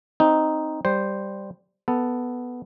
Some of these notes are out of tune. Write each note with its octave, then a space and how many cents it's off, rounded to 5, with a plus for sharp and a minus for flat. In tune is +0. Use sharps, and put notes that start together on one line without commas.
C4 +0 D#4 +0
G3 +0 C5 +0
B3 +0 A4 +0